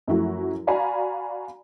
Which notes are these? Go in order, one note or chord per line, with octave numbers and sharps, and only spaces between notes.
F#2 F3 A3 E4 F#4
F#4 D5 F5 G#5 A#5 B5